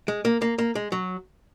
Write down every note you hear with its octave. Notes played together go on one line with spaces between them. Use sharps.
G#3
A#3
A#3
A#3
G#3
F#3